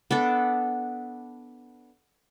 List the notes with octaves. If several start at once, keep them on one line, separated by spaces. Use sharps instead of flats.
B3 D4 A4